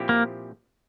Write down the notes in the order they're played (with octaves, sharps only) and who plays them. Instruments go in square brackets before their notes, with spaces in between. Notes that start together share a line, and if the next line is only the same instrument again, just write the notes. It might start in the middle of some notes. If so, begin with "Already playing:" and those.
Already playing: [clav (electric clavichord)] A#2 F3 C4 E4 G4
[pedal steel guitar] A#3